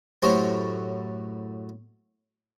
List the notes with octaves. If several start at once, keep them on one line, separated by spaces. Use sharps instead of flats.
F#2 A2 F#3 G4 C5 C#5